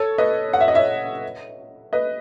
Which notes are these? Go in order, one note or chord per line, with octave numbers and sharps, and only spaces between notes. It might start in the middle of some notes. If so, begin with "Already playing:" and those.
Already playing: A4 C#5
B4 D#5
F#5
E5
D#5
C#5 E5
B4 D#5